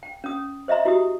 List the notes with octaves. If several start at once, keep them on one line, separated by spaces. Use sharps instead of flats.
G5
C#4 D#6
C5 D#5 E5 A#5 C6
E4 F#4 G4 D#6